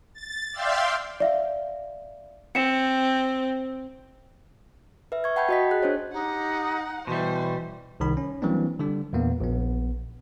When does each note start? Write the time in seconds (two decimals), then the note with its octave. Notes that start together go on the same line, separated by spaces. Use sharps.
0.13 A6
0.51 D5 E5 F5 G5 C6
1.20 D5 E5 F5
2.55 C4 C#7 E7
5.12 B4 E5
5.24 C#6 G#6
5.36 F#5 G5 A5 B5 G6 G#6
5.49 F#4 D#5 B6
5.71 G#4 F#6
5.83 D4 C5 C#5
6.13 D#4 G4 F#5
7.07 B2 E3 G3 C5 C6
8.00 C2 D#3 B5
8.17 C#4
8.42 E3 F#3 G3 A#3 C4 D4
8.79 D3 G3 D4
9.13 E2 A#2 A#3 B3
9.41 A#1 B3